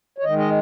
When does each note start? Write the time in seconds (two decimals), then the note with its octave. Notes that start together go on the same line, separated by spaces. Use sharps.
0.18 C#5
0.24 D#3 D#5
0.30 G#3
0.38 D#5